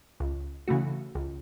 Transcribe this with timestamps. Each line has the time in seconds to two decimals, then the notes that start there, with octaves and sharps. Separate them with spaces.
0.20 C#2
0.68 C#3 E3 A3 F#4
1.15 C#2